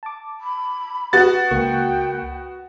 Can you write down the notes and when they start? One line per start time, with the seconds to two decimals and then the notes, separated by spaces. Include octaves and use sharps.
0.03 A5 D6
0.40 B5
1.13 B3 F#4 F#5 A6
1.51 C#2 A#3 G5 C#6